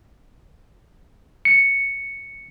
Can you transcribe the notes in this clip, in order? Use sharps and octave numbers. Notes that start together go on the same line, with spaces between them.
C#7